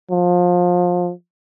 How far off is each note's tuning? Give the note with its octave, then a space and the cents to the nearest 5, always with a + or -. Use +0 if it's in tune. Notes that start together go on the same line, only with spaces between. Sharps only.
F3 +25